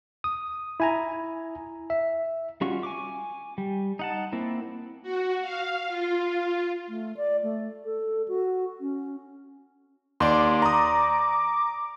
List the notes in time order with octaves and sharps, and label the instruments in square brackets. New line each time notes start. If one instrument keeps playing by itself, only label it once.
[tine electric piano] D#6
E4 G#5 A#5
E5
[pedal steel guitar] G3 C#4 F4 F#4 C#6
G#5 C#6 D6
G3
D#4 F#5 A5
A#3 C4 E4
[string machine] F#4
F5
F4
[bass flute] A3
D5
A3
A4
F#4
C#4
[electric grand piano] D#2 [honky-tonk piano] D5 C6 [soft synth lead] D6
[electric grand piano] A#5 D#6